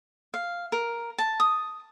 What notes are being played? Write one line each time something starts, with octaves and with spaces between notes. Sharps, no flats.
F5
A#4
A5
D#6